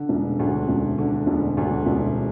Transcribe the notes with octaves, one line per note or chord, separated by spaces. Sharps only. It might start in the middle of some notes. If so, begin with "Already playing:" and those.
Already playing: D3
E1
D2
E1
D3
E1
D2
E1